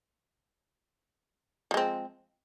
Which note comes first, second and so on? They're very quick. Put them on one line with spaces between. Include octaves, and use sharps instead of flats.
F3 G#3 C4